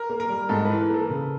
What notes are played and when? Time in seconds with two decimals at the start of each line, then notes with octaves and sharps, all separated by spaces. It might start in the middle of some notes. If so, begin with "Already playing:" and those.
Already playing: A#4
0.09 A#3
0.20 A#4
0.29 G3
0.49 G#2 A4
0.65 E3 B4
0.80 A#4
0.90 A#3 A4
1.10 C#3